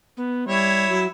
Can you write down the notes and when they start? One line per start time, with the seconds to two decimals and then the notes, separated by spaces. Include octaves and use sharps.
0.17 B3
0.47 G3 E4 C#5
0.89 F#3